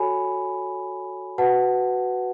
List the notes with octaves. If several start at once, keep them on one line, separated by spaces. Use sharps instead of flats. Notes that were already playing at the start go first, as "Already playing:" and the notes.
Already playing: F#4 A4 C#5 G#5 B5
F#4 B4 F#5 A5